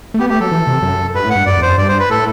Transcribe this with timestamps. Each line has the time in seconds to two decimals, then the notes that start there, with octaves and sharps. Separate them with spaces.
0.14 A3
0.19 B3 G4
0.29 A3 G4
0.40 F#3 A4
0.51 E3
0.67 C3
0.82 F#2
1.15 G2 B4
1.25 A2
1.30 F#5
1.36 G2
1.46 F#2 D5
1.57 E2
1.62 C5
1.67 F#2
1.78 G2 D5
1.88 C5
2.00 B4
2.10 A2 A4